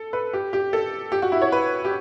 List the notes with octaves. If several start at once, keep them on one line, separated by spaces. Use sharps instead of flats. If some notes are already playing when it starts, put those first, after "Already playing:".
Already playing: A4
B4
G4
G4
A4
G4
F#4
E4
C#5
B4
G4